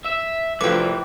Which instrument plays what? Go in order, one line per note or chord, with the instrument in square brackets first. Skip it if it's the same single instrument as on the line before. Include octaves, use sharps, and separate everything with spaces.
[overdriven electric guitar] E5
[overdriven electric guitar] C2 F#2 [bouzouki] E3 G5 [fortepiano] F3 A3 [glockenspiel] D6